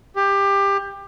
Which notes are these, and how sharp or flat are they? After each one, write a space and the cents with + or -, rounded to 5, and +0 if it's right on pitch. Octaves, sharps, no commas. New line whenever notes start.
G4 +20